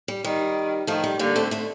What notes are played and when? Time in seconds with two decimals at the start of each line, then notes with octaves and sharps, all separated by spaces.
0.08 G3
0.25 D#3 G3
0.87 D#3 F3 A3
1.04 G3
1.19 D3 G3 A#3
1.36 A3 C4
1.51 A3 C4